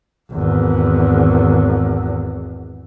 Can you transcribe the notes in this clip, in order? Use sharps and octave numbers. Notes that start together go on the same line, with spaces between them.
G#1 E2